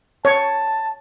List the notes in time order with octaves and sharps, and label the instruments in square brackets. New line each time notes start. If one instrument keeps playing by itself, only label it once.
[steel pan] C#5 [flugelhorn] A5